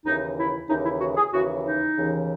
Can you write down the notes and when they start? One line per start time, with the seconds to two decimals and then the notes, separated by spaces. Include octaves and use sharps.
0.06 D#2 C#3 E3 D#4
0.38 E4
0.69 D#2 C#3 E3 D#4
0.85 E4
1.01 F#4
1.17 G#4
1.32 D#2 C#3 E3 F#4
1.64 D#4
1.96 D#2 C#3 E3